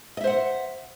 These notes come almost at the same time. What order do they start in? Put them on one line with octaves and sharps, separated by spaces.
D#5 E5 C5 F#5